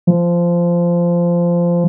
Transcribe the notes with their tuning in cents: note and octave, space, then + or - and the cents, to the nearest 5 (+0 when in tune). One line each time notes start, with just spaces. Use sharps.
F3 -15